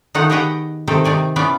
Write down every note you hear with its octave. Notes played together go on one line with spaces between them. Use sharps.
D#3 A3 D#4 F4 F#5
B3 G4 G#4 D#5 F#5 G5
C3 D#3 C4 A4
C3 D#3 D5 G#5
E3 B3 C#4 D5